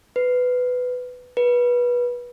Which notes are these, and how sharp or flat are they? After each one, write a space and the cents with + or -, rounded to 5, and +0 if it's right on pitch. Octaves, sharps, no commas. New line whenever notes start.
B4 +15
B4 -20